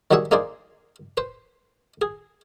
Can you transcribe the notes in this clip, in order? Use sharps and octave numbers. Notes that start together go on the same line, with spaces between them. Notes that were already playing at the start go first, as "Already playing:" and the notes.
D#3 F#3 G3 G#4 E5 F#5
A#3 D#4 G#4 C5 D5
B4 C5
G#4